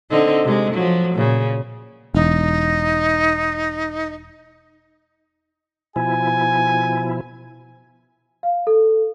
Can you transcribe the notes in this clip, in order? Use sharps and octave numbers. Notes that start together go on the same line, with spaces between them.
D3 C4 D#4
C3 G#3
F3 F#3
A#2 C#3
E1 D#4
B2 F3 E4 G#5
F5
A4